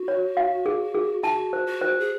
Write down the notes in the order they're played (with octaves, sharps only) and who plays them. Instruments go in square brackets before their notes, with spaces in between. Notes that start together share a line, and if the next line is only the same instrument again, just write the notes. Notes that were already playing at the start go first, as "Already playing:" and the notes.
Already playing: [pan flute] F#4
[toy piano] C#5
F5
G#4
G#4
[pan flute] F#4 [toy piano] A5
[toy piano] C5
[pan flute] F#4
[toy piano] C5
[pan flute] G#4